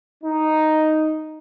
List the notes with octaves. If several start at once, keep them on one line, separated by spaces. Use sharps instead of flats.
D#4